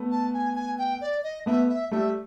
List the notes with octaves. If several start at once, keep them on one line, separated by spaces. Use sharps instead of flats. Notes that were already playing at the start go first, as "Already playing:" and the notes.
Already playing: A3 B3
A5
G#5
G#5
G5
D5
D#5
A3 B3 E5
E5
G3 A3 E5